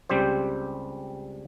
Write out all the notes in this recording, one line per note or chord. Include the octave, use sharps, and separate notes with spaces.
C#2 G3 C4 G4 C5